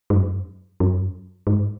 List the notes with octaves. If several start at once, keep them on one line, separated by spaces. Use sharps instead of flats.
G#2
F#2
F#2
G#2